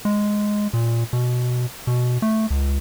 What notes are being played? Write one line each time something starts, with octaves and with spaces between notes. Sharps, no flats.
G#3
A#2
B2
B2
A3
C#2